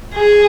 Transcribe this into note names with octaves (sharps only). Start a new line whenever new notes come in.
G#4